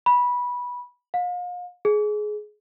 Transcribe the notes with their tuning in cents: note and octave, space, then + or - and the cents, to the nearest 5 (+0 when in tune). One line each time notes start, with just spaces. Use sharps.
B5 -15
F5 +40
G#4 +20